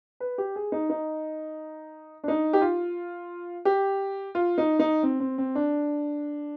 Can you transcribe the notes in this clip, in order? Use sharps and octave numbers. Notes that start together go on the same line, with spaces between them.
B4
G4
G#4
D#4
D#4
D4
D#4
G4
F4
G4
F4
D#4
D#4
C4
C4
C4
D4